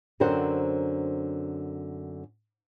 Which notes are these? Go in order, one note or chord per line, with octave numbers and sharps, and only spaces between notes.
F#2 D3 C4 A#4 C5 F#5